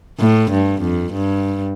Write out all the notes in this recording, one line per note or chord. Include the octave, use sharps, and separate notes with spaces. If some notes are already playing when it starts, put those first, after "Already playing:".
A2
G2
F2
G2